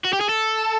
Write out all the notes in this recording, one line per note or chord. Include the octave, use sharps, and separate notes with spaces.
F#4
G4
G#4
A4